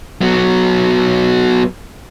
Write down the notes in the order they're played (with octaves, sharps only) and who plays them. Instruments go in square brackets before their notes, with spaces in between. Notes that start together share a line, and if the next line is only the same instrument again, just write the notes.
[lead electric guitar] F#3 B3